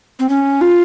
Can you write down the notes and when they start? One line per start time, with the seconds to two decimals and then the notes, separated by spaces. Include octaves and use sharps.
0.19 C4
0.29 C#4
0.61 F4